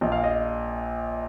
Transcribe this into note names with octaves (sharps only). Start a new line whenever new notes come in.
A#1 A#2 D#5
F5
D#5